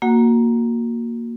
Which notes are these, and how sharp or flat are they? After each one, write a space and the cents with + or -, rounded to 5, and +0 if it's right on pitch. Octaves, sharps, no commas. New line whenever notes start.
A#3 +0 F#4 -15 F#5 +0